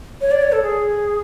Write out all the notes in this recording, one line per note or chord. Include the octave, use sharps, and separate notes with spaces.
C#5
D5
C#5
A4
G#4